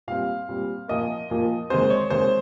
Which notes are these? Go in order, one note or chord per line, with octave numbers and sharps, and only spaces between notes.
A#2 G3 C4 F5
A#2 G3 C4
A#2 F3 A#3 D#5
A#2 F3 A#3
D#3 G#3 C4 C5
C#5
D#3 G#3 C4 C5